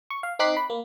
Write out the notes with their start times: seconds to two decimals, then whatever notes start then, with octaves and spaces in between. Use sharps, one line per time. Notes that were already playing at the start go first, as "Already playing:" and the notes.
0.10 C#6
0.23 F5
0.39 C4 D#4 D6 F#6 B6 C7
0.57 B5
0.70 A#3